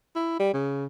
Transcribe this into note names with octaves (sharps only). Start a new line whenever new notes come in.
E4
G3
C#3